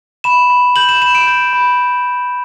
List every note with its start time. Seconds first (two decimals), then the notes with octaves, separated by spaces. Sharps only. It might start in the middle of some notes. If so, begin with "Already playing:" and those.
0.24 B5 E7
0.50 B5
0.76 G6 F#7
0.89 E7
1.02 B5 E7
1.15 D7
1.27 G6
1.53 B5